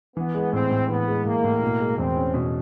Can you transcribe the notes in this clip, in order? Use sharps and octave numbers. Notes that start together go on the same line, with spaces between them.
E3 B3
G#3
A2 C4
A2
E3 B3
G#3
A2 A#3
A2
B2
G#3
E2 C4
C#4
B2